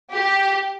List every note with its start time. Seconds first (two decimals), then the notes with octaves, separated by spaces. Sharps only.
0.13 G4